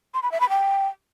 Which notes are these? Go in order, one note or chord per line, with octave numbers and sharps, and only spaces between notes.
C6
B5
E5
B5
G5